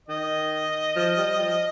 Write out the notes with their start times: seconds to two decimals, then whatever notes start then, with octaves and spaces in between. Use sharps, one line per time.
0.08 D#3 D#5
0.96 F3
1.17 G3
1.40 F3